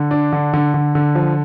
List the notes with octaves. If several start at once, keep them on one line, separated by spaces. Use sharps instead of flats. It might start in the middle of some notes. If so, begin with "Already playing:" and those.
Already playing: D3
D4
D3
D3
D3
D3
F3